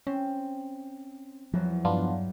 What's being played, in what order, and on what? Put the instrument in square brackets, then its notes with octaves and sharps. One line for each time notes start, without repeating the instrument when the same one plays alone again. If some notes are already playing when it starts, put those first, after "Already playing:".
[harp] C4 [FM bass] C#4
[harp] E2 F#3 [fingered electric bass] F3
[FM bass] G2 [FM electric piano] B3 D4 F4